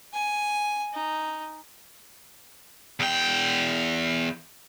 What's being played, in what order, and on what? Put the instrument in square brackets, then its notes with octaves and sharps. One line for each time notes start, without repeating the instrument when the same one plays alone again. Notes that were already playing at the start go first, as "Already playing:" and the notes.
[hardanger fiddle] G#5
D#4
[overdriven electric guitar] E2 G5